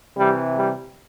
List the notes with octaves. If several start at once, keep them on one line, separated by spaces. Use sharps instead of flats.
C3 E3 G3
G3